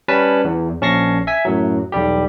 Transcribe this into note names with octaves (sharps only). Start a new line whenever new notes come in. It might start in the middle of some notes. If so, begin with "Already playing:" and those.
G3 C#4 B4 A5 B6
E2
A#1 C#4 A5 C#6 A#6 C7
E5 G#5 B6
F#2 A2 F#3
B1 E2 G3 G4